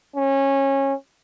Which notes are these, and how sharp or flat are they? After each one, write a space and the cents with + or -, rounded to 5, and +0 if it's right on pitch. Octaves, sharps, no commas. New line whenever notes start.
C#4 -20